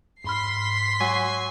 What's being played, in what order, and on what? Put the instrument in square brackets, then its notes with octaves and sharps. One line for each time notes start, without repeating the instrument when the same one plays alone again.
[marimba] G#2 B5 F6 [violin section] C6 B6 C7
[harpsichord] F#3 [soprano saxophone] G#5